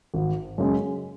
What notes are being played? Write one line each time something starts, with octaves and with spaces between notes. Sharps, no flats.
G#1
F#2 C#3 G#3